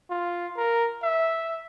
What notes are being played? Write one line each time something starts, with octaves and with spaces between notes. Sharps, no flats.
F4
A#4
E5